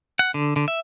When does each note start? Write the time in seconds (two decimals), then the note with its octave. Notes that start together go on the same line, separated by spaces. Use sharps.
0.19 F#5
0.34 D3
0.56 D3
0.68 E5